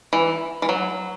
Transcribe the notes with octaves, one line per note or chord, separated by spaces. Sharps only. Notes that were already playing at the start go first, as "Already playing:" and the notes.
E3
E3
F#3